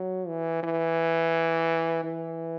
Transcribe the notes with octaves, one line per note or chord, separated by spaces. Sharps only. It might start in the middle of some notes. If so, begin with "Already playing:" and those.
Already playing: F#3
E3
E3
E3